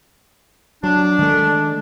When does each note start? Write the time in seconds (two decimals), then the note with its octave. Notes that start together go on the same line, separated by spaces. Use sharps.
0.83 F#3 D4
1.19 D#3 G#3 A3